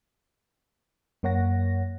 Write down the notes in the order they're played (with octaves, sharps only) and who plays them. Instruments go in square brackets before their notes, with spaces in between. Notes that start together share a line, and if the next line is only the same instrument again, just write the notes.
[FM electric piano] F#2 A#3 C#5 F#5 A#6